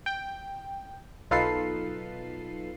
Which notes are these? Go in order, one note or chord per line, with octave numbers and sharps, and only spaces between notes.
G5
B1 D#4 F4 A4 B4 C7